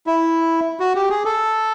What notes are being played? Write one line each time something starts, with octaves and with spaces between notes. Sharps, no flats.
E4
F#4
G4
G#4
A4